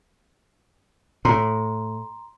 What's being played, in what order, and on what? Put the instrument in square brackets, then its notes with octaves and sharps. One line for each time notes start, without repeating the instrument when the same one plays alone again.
[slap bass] A2 [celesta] A#5 C6